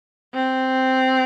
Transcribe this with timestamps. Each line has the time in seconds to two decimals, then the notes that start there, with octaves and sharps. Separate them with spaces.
0.34 C4